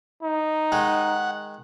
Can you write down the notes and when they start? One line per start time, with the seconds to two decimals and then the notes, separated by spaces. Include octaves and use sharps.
0.23 D#4
0.72 D#3 G#3 F#5